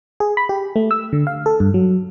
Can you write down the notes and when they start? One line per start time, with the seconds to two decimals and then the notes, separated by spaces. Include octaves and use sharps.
0.20 G#4
0.37 B5
0.49 G4
0.76 A3
0.91 E6
1.13 D3
1.27 F5
1.46 A4
1.60 G2
1.74 F#3